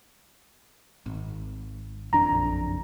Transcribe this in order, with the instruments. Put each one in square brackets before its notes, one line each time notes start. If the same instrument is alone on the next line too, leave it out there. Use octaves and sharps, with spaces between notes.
[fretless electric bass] G#1
[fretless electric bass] F#1 F2 D4 [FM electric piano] A#5
[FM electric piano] A#1